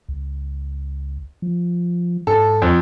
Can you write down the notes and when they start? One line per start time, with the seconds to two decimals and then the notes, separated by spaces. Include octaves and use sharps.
0.09 C#2
1.42 F3
2.27 G#2 A4
2.62 F2